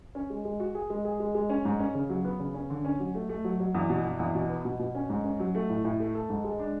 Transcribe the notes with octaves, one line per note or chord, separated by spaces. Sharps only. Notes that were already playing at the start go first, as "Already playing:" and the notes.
C#4
G#3
G#3
F#4
G#4
G#3
G#4
G#3
G#3
C#4
G#2
C#4
C#3
F#3
B3
C#3
C#4
D3
C#4
F#3
A3
A3
F#3
F#3
E2
B2
E2
E2
B2
B3
B2
B2
C#4
G#2
C#4
F#3
A3
A2
A2
A3
A4
G#2
G#3
D4